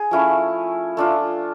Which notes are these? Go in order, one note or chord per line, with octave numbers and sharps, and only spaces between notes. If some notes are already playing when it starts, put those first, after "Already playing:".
Already playing: G#4
F3 A3 C#4 E4
A3 D4 F4